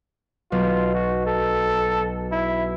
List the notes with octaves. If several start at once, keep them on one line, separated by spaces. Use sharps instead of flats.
B1 F4
F#4
A4
E4